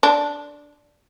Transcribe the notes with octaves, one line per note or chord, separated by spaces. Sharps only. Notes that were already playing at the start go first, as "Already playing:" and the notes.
D4